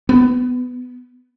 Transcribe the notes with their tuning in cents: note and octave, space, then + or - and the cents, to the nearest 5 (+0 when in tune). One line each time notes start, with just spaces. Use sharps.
B3 +15